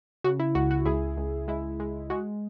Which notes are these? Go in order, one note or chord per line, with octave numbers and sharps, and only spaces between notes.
C#3 F#4
E4
C#2 F#4
F#4
C#2 E4 G#4
C#2
G#3 E4
G#3
G#3 F#4